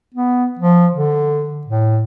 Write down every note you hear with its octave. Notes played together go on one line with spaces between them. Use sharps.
B3
F3
D3
A2